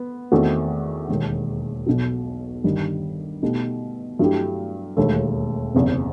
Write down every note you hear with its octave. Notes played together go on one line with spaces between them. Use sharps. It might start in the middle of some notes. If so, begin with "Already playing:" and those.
Already playing: B3
E2 D#3 A3 C4 F#4
E1 D#2 D#3
B1 B2 F#3
G1 G2 D#3 G3 D#4
B2 A3 D#4 G4
G2 F#3 A3 E4 G4
E1 D#2 D#3 A3
F#1 E2 C3